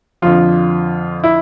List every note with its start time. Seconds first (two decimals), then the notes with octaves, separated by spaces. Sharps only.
0.22 F2 D3 F3 F4
1.24 E4